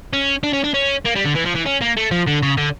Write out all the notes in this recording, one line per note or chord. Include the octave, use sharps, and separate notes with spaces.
C#4
D4
C#4
D4
C#4
A#3
G3
D3
E3
F3
E3
C#4
A#3
A3
F3
D3
C#3
D3